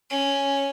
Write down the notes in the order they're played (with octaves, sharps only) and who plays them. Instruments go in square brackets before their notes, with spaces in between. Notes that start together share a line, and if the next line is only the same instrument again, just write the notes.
[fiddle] C#4